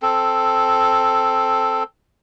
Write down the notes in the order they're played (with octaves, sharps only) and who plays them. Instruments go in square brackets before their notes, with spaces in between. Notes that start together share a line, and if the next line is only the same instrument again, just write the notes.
[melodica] C4 A4